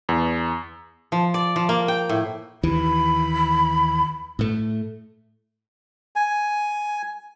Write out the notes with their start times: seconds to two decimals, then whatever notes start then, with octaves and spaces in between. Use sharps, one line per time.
0.09 E2
1.12 F3
1.34 D5
1.56 F3
1.69 A#3
1.88 G5
2.09 A2
2.63 D#2 E3 B5
4.39 A2 A3
6.16 G#5